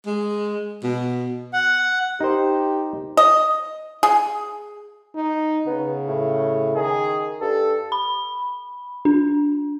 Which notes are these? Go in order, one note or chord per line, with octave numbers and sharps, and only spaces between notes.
G#3
B2
F#5
D#4 G4 A#4 C5
D#5
G#4
D#4
C#3 B3
A2
D#3 G#4
G2 A4
B5
D4